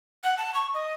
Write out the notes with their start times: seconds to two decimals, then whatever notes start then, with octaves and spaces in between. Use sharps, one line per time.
0.24 F#5
0.37 A5
0.54 C#6
0.74 D#5